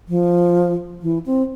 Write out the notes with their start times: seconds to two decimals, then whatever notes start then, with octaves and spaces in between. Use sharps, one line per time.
0.09 F3
1.02 E3
1.26 C4